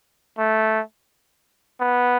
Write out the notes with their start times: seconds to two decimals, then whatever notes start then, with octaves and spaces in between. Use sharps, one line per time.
0.38 A3
1.80 B3